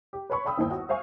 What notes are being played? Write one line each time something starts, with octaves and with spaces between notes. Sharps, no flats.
G4
B4 C#5 B5 C#6
D5 F5 G5 B5 D#6 E6
G1 D#2 D#3 E4 C5 G5
F#4
C5 E5 F5 G#5 C#6